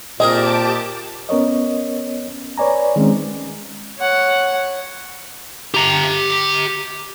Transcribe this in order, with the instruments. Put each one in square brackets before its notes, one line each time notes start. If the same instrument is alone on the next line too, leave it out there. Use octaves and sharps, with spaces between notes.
[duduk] A#2 [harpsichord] C4 G#4 A#4 [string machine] G4 A5 D6 [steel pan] D#5
[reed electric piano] B3 C#4 A#4 C#5 D#5
B4 C#5 D5 G#5 A#5
D#3 G#3 C4 C#4
[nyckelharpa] C#5 F#5
[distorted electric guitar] G4 A#5